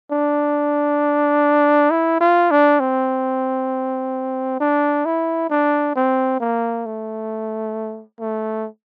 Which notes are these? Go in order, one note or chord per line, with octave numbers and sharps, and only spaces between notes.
D4
E4
F4
D4
C4
D4
E4
D4
C4
A#3
A3
A3